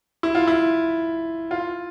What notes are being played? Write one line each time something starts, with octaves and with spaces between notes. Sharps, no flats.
E4
F4
E4
F4